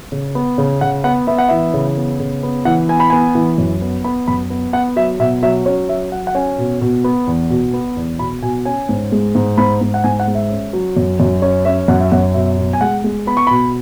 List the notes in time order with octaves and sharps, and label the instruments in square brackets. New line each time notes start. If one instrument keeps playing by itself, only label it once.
[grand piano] C#3
B3
C#3
C#3 F#5
B3 F#5
B3 E5
F#5
E3 E5
C#3
B3
C#3
B3
E3 F#5
B3 G#5
B5
B3 G#5
E3
F#2
B3
B3 B5
F#2 B5
B3
B3 F#5
F#3 E5
B2 E5
F#3 E5
C#4 C#5
F#3 E5
F#3 F#5
F#5
C#4 G#5
B2
B2
B3
E2
B2
B3
E2
B2 B5
B2 G#5
C#4 G#5
G#2
G#3
G#2
G#2 B5
G#2
F#5
G#2 G#5
F#5
G#3
E5
C#4
F#3
F#2
F#2
C#4 C#5
C#4 E5
F#2 F#5
E5
F#2 F#5
B2 E5
B2
G#5
G#3 F#5
G#3
B3 B5
C#6
B2 B5